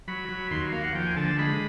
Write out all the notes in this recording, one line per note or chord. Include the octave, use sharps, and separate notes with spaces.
F#3 B5
F#3
D#2 C6
A#3 F5
F#5
F3 G5
G#5
D3 A5
G#3 B5